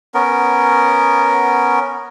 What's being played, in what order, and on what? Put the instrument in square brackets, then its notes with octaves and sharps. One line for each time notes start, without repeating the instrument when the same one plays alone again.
[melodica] B3 C#4 A#4